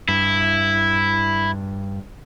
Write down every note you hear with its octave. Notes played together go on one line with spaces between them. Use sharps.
G2 E4